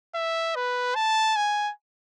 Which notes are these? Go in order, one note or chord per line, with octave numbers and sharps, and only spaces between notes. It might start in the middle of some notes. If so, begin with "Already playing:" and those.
E5
B4
A5
G#5